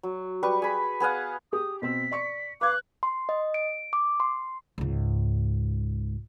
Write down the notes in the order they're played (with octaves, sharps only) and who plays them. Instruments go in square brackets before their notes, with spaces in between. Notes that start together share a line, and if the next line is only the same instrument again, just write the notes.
[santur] F#3
G3 B4 C#6
G#4 B5
B3 G#4 F5 F#5
[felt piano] G4 G#4 [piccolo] D#6
[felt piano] B2 C4 E6 [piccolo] B6
[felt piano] D5 C#6 C#7
[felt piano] B4 G#6 [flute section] F5 D6 [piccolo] F#6
[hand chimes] C6
D#5
D7
D6
C6
[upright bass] C#2 G#2